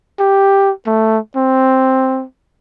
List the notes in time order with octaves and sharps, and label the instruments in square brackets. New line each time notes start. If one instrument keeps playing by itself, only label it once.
[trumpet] G4
A3
C4